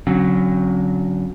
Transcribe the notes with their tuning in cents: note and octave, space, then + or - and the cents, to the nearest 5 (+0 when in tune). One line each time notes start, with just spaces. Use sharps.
D3 -40 F#3 +0 C4 +45